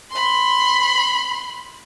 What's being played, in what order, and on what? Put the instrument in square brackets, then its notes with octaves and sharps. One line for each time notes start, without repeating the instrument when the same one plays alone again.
[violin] B5 C6